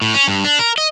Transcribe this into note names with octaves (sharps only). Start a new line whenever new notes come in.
A2
C#4
G2
D4
A#4
D#5